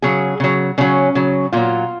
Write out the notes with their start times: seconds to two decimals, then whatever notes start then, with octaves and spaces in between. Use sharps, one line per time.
0.02 C#3 F#3 G#4
0.40 C#3 F#3
0.78 C#3 F#3 C#4
1.15 C#3 F#3
1.52 A#2 F#3 F4